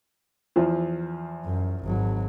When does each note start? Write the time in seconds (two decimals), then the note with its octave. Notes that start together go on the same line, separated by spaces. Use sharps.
0.56 E2 F3
1.45 F#2
1.85 G#1 F#3